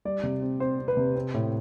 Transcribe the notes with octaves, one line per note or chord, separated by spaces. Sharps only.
G3 D5
C3
C4
C4 C5
C4
B4
C3
C4
A2